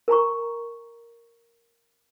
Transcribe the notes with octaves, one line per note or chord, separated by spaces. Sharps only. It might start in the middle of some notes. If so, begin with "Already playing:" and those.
A#4 G#5 A#5 C#6